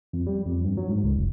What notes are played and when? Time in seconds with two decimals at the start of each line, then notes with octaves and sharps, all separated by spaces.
0.13 F2
0.27 G3
0.46 F2
0.64 G2
0.77 F#3
0.89 G#2
1.03 C#2
1.16 F1